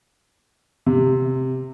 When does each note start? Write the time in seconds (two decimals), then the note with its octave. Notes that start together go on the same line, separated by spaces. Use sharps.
0.86 C3